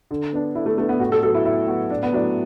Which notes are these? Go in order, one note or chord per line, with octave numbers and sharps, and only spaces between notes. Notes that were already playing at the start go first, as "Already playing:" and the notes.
D3
B3 D4
D3 E4
A3
A3 B3 D4
B3
A2 F#4
A4
F#3 B3 F#4 A4
E4
A2 E4
F#3 B3 F#4
A2 D4
B3
F#3 A3 D4 E4